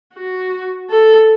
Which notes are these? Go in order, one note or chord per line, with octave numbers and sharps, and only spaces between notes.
F#4
A4